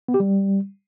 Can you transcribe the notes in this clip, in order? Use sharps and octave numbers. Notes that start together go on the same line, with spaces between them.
B3
G4
G3